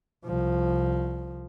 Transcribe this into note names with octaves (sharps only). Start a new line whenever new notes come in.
C2 F3